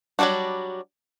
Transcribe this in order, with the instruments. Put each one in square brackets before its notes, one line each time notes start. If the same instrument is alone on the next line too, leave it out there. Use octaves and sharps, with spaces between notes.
[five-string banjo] F#3 G3 A3 D4 F#4